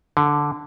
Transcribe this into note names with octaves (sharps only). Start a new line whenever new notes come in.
D3